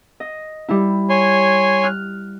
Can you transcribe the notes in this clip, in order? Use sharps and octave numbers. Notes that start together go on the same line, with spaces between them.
D#5
G3 E4
C#5 G#5 C6
F6 F#6